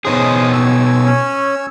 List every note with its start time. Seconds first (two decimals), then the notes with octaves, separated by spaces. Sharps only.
0.05 B2 C#4 D#4 G#4 C5 D#6
0.52 C#5 G#5 E6
1.06 C#4